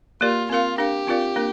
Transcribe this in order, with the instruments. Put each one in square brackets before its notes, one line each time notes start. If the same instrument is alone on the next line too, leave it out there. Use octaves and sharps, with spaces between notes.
[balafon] A#3 G4 A#4 D5 [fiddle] F4
[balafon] C4 A#4 F5 [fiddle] F4
[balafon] D4 A#4 F5 [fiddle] G4
[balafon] C4 F4 A#4 D5 F5
A#3 D4 A#4